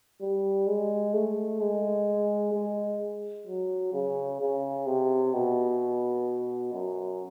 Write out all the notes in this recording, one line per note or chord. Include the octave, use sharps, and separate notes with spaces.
G3
G#3
A3
G#3
G#3
F#3
C#3
C#3
C3
B2
F#2